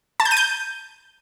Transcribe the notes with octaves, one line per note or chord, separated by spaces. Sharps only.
A5
G6
D#7
G6